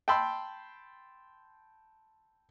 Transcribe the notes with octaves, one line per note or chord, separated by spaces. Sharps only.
G5 A5 B5 C6 E6